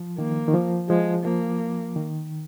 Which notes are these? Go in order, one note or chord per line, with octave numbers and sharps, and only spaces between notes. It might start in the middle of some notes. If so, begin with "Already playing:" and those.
Already playing: F3
D#3 A#3
D#3
F3
F3 G#3
F3 A#3
D#3